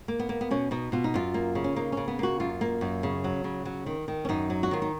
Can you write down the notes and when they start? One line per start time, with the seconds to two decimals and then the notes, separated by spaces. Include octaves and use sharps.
0.08 A#3
0.19 B3
0.29 A#3
0.41 B3
0.51 B2 C#4
0.71 B2 D#4
0.92 B2 F4
1.04 D#4
1.14 F#2 F4
1.34 A#3
1.55 C#3
1.64 C#4
1.76 A#3 D#4
1.92 C#3 C#4
2.08 B3
2.19 A#3 F#4
2.40 F#2 F4
2.61 A#3
2.81 F#2
3.03 C#3
3.24 F#3
3.44 C#3
3.65 F#3
3.86 D#3
4.08 D#3
4.25 C#4
4.29 F#2 D#4
4.50 F#3
4.63 F#4
4.71 D#3 F4
4.82 D#4